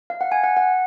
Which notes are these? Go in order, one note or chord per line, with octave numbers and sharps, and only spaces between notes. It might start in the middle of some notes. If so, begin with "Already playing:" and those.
F5
F#5
G#5
F#5
F#5